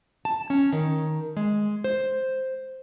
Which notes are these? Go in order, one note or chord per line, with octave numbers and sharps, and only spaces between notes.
A5
C#4
D#3
G#3
C5